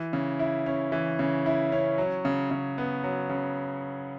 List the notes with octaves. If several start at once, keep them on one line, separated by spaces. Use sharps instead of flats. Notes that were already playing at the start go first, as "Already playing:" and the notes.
Already playing: E3
C#3
E4
C#4
E3
C#3
E4
C#4
F#3
C#3
C#3
B3
F#3
C#3